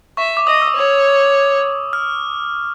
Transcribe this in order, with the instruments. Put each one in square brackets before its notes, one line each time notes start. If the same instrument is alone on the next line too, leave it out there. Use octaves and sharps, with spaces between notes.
[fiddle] E5 [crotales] C#6
[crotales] D6
[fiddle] D#5 [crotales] D#6
[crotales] E6
[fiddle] C#5
[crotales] F6